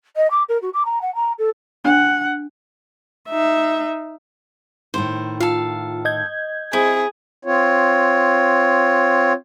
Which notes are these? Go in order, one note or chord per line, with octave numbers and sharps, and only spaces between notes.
D#5
D6
A#4
F#4
D6
A#5
F#5
A#5
A4
D4 F#5
D#4 E5
A2 D#3 E4 C5
F4 A4 F5
D#5 G6 G#6
C4 E4 G#4
C4 F4 C#5